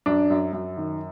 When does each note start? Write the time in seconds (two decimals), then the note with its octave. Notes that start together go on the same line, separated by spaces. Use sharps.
0.06 F#2 D4
0.30 F#2
0.53 F#2
0.77 D#3